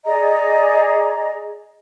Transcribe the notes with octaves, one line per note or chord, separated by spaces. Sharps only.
G#4 D5 D#5 A#5